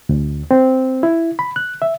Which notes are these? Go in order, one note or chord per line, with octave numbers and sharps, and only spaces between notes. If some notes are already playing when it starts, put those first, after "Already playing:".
D2
C4
E4
B5
F#6
E5